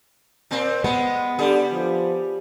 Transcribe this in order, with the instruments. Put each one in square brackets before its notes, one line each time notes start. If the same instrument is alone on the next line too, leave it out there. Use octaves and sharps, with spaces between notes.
[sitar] A#2 C4
[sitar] G#3 [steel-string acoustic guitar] B3
[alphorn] D3 [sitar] G3 G#4
[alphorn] F3